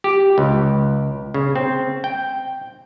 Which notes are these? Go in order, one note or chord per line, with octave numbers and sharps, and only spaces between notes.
G4
C#2
C#3
C4
G5